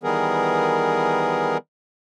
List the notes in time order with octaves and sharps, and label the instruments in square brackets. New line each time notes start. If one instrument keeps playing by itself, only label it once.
[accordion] D#3 E3 G3 B3 G#4 A#4